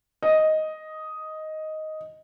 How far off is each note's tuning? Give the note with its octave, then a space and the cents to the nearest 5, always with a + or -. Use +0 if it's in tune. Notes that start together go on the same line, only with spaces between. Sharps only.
D#5 +5